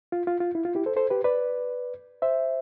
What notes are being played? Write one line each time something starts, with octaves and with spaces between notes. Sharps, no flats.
F4
F4
F4
E4
F4
E4 G4
A4 C5
A4 C5
G4 B4
B4 D5
C5 E5